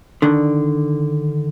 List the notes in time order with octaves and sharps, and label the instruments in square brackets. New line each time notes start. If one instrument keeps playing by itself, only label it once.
[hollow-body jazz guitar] D3 D#3 D4